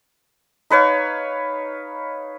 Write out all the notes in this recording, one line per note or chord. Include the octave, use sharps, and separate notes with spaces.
D#4 B4 C#5 F5